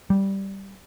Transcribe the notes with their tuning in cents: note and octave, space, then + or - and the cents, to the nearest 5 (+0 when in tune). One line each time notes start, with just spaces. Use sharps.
G3 -5